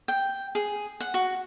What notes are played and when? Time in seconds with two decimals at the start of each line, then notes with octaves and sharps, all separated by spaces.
0.08 G5
0.55 G#4
1.00 F#5
1.14 F#4